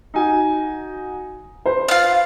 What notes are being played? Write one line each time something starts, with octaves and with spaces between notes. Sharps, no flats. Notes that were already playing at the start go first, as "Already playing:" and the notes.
D#4 F#4 G#5
B4 C5
F4 F5